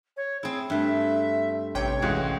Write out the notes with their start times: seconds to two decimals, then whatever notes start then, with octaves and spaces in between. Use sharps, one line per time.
0.17 C#5
0.43 C4 E4 G#4
0.70 G2 A3 E5
1.75 A1 C3 C#5 G5
2.02 C#2 E3 G#3 F#4